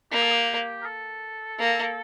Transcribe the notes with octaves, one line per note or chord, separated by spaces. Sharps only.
A#3 G4
A4
G4
A#4
A4
A#3